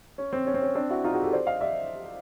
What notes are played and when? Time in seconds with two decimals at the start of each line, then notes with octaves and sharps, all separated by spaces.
0.18 C#4
0.33 C4
0.47 C#4
0.54 C4
0.62 C#4
0.75 C4 D4
0.90 E4 F#4
1.04 D#4 F4
1.13 F#4 G#4
1.23 G4 A4
1.33 C5 D5
1.47 D#5 F5
1.61 D5 E5